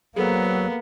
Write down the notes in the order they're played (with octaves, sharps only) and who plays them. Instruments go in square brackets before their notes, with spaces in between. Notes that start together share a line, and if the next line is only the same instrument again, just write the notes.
[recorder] F#3 [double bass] A#3 [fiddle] B3 [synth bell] G#4 A4 C5